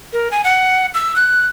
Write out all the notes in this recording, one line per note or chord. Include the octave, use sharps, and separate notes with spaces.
A#4
G#5
F#5
E6
F#6